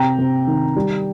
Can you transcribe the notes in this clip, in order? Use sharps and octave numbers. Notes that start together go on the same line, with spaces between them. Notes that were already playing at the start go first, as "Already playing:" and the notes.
Already playing: C3 G5 A#5
C3
D#3
G3